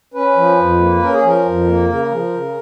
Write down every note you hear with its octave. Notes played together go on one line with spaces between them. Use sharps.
C#4 B4
F3
F2
A#3
C#4 A#4
G#4
F3 A#4
F2
A#3
C#3 A#4
F3
C#3